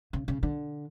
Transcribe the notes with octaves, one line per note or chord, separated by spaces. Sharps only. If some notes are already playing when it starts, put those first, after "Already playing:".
C#3
C#3
D3